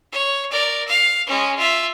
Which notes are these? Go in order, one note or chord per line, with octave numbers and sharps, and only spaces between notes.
C#5
A#4 D5
F5
G#3 C#4
F4 E5